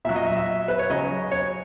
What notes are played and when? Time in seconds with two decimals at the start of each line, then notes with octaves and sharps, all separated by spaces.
0.05 A#2 E5
0.09 F#3
0.16 D#5
0.27 E5
0.37 E5
0.68 B4
0.79 C#5
0.90 C#3 F#3 D#5
1.31 C#5